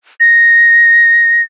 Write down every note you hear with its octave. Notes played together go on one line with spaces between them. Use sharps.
A#6